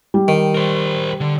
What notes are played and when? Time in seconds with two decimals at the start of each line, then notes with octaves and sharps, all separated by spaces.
0.14 G3
0.28 D#3
0.55 A#4 C5
1.21 D3